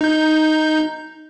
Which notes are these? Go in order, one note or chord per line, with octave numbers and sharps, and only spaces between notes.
D#4 G6